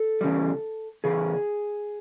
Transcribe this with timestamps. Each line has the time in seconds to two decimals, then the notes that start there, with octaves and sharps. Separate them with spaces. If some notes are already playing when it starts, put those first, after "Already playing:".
Already playing: A4
0.21 E2 C#3 G3
1.04 E2 C#3 G#4